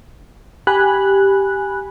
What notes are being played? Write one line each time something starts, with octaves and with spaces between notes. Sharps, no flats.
G4 G#5 B5 F#6